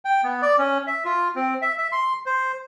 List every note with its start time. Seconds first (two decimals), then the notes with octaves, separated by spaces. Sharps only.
0.05 G5
0.23 B3
0.42 D5
0.58 C#4
0.87 E5
1.05 F4
1.36 C4
1.62 E5
1.78 E5
1.92 C6
2.26 C5